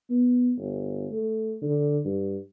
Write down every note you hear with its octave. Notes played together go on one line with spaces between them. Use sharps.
B3
G1
A3
D3
G2